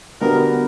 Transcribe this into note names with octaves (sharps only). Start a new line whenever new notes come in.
D3 G3 B3 F#4 A#4